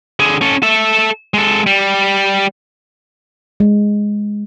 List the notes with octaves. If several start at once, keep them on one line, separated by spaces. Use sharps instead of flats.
D3 G#4
C#4 A4
A4 E5
G#3 A4
G3
G#3